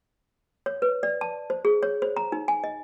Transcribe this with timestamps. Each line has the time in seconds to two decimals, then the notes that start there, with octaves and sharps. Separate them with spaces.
0.66 C#5
0.82 B4
1.03 D5
1.21 A5
1.50 C5
1.65 G#4
1.83 C#5
2.02 C5
2.17 A#5
2.32 D#4
2.48 G#5
2.64 D#5